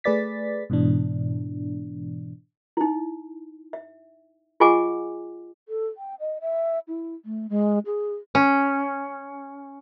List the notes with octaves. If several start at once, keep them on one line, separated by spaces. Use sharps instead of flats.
A3 G#4 B4 D5 A6 B6
G#2 B2 E3 D4
D#4 E4
E5
F4 G#4 D#5 F#5 G#5 D6
A4
G5
D#5
E5
E4
A3
G#3
G#4
C#4